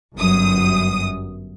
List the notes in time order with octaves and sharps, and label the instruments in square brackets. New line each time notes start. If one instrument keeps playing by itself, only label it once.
[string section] G1 F#2 D#6